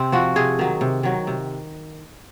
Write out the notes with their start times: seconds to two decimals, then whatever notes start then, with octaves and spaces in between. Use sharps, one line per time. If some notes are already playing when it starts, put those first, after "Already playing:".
Already playing: C3 C4
0.12 F3 F#4
0.36 C3 G#4
0.59 D#3 F#3
0.81 C3
1.03 D#3 F#3
1.27 C3